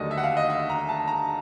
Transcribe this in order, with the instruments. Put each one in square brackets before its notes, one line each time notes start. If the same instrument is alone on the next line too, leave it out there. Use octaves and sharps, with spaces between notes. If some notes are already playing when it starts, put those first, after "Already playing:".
Already playing: [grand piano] D#2 D3 F#3 A3 D5 D#5
E5
F#5
F5
D#5
E5
A#5
A5
A#5